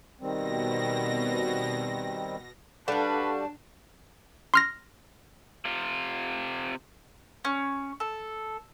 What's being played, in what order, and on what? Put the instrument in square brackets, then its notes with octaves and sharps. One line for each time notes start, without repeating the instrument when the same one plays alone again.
[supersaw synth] B2 A#6 [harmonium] D#3 G3 C4
[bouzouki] G3 F#4 [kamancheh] D4 A5 [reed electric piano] A4 F5 F#5 [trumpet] B4
[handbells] C6 F6 A#6
[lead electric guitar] C3 F4
[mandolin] C#4
A4